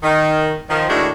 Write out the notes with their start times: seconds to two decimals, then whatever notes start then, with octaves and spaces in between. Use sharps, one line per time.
0.03 D#3
0.69 D#3 F3
0.89 A2 D#3 G#3 A3 D4 F#4